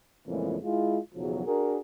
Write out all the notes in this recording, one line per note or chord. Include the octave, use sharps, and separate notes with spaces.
F2 A#2 C#3 E3 G#3 A3
G#3 E4 F4
B1 E2 C#3 F3 F#3
D4 F#4 G#4 A#4